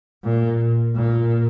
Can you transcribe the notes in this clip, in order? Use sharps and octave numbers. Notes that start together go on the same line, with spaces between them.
A#2
A#2